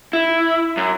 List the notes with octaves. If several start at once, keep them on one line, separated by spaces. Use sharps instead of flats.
E4
F#2